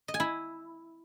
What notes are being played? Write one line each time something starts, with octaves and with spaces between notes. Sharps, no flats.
D#5
G#5
E4